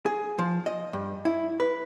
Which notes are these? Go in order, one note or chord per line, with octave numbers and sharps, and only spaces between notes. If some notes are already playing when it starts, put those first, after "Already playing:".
G#4
F3
D#5
G2
E4
B4